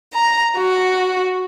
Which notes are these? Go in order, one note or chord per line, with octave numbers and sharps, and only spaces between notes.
A#5
F#4